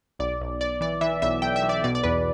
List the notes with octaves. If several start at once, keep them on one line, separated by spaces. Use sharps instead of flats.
B1 D5
B1
B1 D5
E3 D5
E3 E5
B1 E5
B1 G5
E5
B1
D5
B2 D5
D5
E2 B4